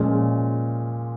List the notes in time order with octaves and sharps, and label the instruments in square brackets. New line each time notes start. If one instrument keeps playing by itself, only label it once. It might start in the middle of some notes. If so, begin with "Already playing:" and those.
Already playing: [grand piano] A#2 F3 G#3 C#4